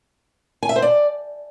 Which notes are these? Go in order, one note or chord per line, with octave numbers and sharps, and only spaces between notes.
G#5
E5
C5
D5